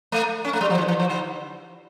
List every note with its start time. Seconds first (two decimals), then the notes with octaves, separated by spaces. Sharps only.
0.12 A3
0.45 C#4
0.53 A3
0.61 G3
0.70 F3
0.78 E3
0.88 E3
1.00 F3
1.09 D3